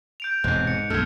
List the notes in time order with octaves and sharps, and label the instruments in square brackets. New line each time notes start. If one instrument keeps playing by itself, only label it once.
[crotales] G6 D7 F7
[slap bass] E1 C3 [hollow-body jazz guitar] G#2 [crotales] F#6 G6
[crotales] C#7
[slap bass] B1 F#2 [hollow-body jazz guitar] A3 [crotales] F6 G#6